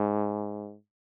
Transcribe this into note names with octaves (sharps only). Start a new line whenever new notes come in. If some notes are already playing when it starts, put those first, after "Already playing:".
Already playing: G#2